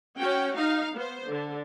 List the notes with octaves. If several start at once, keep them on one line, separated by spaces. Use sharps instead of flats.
C#4 F#4 G5
D#4 F5
B3 C5
D3